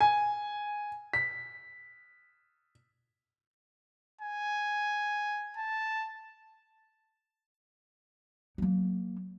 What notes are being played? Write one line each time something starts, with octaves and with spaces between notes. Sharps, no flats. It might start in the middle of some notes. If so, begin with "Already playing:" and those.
G#5
B6
G#5
A5
F#3 A#3